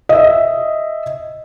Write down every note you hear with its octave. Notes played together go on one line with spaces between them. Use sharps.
D#5 E5